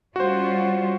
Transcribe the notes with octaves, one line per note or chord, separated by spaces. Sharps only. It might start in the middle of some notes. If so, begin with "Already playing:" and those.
G3 C#4 F4 F#4 C5